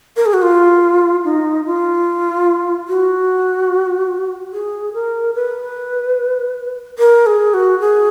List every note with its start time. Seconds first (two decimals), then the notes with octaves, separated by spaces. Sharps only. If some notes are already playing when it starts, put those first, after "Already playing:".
0.17 A#4
0.26 G#4
0.34 F#4
0.42 F4
1.24 D#4
1.66 F4
2.88 F#4
4.53 G#4
4.94 A#4
5.35 B4
6.99 A#4
7.26 G#4
7.54 F#4
7.80 G#4